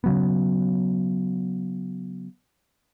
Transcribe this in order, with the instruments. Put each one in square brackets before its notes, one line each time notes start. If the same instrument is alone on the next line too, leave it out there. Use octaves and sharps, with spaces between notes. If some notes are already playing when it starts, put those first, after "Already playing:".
[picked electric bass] C#3 F#3 B3